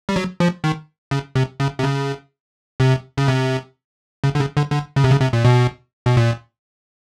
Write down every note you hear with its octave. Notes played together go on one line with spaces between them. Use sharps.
G3
F#3
F3
D#3
C#3
C3
C#3
C3
C#3
C3
C#3
C3
C#3
D3
C#3
D3
D3
C#3
C3
C#3
C3
A#2
B2
B2
A#2